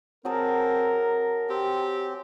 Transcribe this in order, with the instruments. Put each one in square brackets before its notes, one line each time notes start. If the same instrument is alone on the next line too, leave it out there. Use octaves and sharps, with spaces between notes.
[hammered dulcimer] F#3 G#4 A5 [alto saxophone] C4 [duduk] A#4
[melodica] C4 [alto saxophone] G4